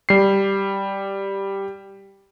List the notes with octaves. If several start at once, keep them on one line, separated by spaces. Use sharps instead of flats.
G3 C7